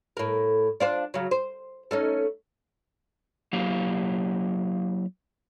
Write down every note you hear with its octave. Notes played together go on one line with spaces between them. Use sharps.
A2 A#4
D4 F4 C5
C#3 F#3
C5
A3 C#4 D#4
F#3 A#3 E4 G4 F5